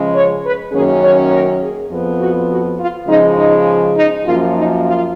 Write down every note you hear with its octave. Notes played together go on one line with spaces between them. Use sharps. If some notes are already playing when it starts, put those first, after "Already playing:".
Already playing: C#3 F3 G#3
C#5
B4
F#2 D#3 F#3 A#3 C#4 G#4
C#5
A#4
G#4
F2 F3 B3
F#4
F#4
F4
C#3 F3 G#3 D#4
D#4
D#4
F#2 F3 A#3 F4
D#4
F4